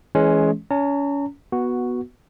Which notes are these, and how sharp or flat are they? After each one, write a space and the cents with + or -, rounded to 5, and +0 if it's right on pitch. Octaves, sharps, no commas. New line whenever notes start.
E3 -10 G#3 +20 C#4 +0
C#4 +30 A#5 -40
B3 -10 F#4 +0